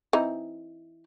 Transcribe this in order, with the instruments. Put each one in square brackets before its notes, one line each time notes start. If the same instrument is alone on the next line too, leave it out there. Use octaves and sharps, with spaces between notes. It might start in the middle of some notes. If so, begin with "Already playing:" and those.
[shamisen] E3 C4 D#4